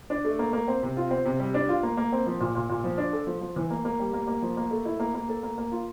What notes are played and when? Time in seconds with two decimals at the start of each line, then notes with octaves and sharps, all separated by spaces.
0.10 D4
0.25 A3
0.39 A#3
0.53 A#3
0.68 C4
0.83 C3
0.97 F4
1.11 C4
1.25 C3
1.40 G3
1.54 D4
1.69 F4
1.83 A#3
1.97 A#3
2.12 C4
2.27 F3
2.40 A#2
2.55 A#2
2.69 A#2
2.84 F3
2.98 D4
3.13 A4
3.27 F3
3.41 F3
3.56 E3
3.70 A#3
3.85 A#3
3.99 G3
4.13 A#3
4.28 A#3
4.42 F3
4.57 A#3
4.71 A3
4.85 E4
5.00 A#3
5.14 A#3
5.29 A4
5.43 A#3
5.58 A#3
5.72 F4